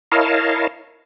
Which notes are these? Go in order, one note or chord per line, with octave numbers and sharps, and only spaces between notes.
E4 A#4 C#5 D#5 F5 A5